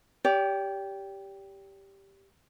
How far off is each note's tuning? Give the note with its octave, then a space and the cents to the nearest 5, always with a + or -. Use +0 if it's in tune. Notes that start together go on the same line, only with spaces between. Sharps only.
G4 +0 D5 -45